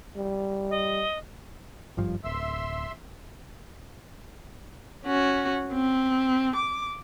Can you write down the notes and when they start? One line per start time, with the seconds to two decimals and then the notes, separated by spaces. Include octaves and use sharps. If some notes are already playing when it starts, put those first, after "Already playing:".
0.16 G3
0.70 D#5
1.97 G#1 G2 F3
2.24 D1 E5 C6 E6
5.05 C#4 F#4
5.73 C4
6.55 D6